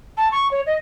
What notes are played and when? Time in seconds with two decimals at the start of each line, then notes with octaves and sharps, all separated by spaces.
0.17 A5
0.32 C#6
0.51 C#5
0.67 D#5